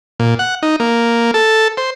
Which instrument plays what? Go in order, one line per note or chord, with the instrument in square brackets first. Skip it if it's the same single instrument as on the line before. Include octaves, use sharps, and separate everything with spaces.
[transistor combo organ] A#2
F#5
D#4
A#3
A4
C5